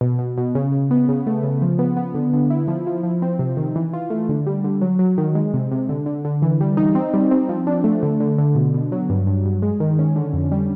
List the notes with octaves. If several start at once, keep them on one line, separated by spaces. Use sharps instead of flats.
B2
B2
B2
C#3
C#3
B3
C#3
A3
C#3
F3
B3
B3
D3
D3
E4
F3
F3
F3
C4
C3
D#3
E3
F4
A3
D3
G3
D3
F#3
F#3
D#3
G#3
C3
C3
D3
D3
D3
E3
G3
D#4
C4
G3
C4
F3
D4
A3
D3
D3
D3
B2
B2
F#3
G2
G2
G2
G#3
D#3
C#4
D3
F2
G3